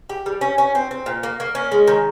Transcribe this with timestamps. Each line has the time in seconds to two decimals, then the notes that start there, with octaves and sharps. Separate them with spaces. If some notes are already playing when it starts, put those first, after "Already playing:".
0.09 G4
0.26 G3
0.41 C#4
0.58 C#4
0.75 C4
0.91 C4
1.06 A#2
1.23 A#3
1.40 A#3
1.55 C#4
1.72 G#3
1.87 D#3